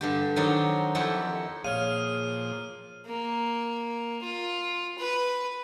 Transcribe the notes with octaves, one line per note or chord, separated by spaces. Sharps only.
G2 D3 G4
D#3 F#3 C4 D4 D#4
F2 D#4 E4 G4 F#5 A5
A#2 F3 G#4 C#5 F5 F6 D#7
A#3
F4
B4